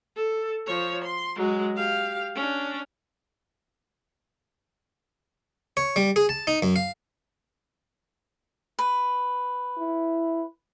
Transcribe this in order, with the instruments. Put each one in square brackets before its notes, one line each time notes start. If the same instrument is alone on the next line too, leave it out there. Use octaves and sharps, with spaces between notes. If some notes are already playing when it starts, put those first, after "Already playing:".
[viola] A4
F3 C#5
C6
F#3 G#3
G4 F5
C#4 D4
[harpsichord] C#5
G3
G#4
A5
D#4
F#2
F5
[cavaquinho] B4
[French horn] E4